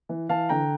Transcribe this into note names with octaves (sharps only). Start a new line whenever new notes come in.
E3
E3 F5 A5
D3 G5 A#5